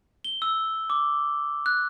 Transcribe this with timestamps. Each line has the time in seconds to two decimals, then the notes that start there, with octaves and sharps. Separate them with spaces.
0.24 G7
0.42 E6
0.90 D6
1.66 F#6